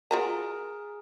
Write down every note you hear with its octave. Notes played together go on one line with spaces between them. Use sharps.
F4 F#4 G#4 A#4 A#5